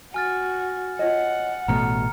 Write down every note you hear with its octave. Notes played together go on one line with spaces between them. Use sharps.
F#4 G#5 F6 A6
F4 C#5 D#5 F#5
A1 B2 A3 C#4 A#5 F6 C#7